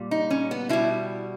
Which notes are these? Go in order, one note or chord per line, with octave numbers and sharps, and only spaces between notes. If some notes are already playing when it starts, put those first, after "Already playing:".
Already playing: A#2 G3
D#4
C#4
B3
B2 G3 E4